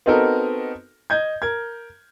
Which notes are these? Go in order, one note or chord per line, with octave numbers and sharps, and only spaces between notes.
B3 C4 D#4 F#4 A4 A#4
D#5 G6 G#6
A#4 G#6